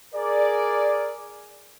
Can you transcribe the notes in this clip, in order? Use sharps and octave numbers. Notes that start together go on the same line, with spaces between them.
G#4 A#4 D5